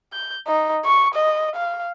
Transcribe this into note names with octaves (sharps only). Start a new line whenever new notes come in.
G6
D#4
C#6
D#5
F5